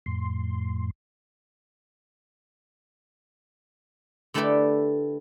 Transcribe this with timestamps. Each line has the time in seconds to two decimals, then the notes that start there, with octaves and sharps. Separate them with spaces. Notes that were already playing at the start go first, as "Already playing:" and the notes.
0.06 F2 A2 C6
4.34 D3 A3 E4 G4 B4 D5